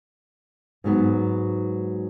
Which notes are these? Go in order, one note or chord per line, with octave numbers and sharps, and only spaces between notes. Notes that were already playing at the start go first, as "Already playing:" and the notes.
G#2 F#3 B3